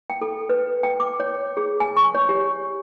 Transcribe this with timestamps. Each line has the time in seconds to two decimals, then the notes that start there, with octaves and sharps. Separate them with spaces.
0.10 G5
0.21 A4
0.49 B4
0.83 G5
1.00 D6
1.20 C#5
1.57 G#4
1.80 G#5
1.96 C#6
2.15 C#5
2.29 G4